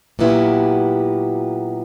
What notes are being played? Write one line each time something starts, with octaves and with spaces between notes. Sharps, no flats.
A#2 F#3 B3 E4 G4